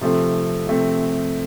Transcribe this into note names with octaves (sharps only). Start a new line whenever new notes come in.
C3 F3 A3 C4
C3 F3 A3 C4